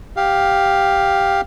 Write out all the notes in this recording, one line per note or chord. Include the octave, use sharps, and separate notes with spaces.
G4 F5